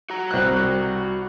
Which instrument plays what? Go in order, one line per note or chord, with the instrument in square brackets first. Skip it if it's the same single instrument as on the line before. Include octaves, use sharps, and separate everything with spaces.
[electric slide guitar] F#4 A#5
[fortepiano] C2 F#6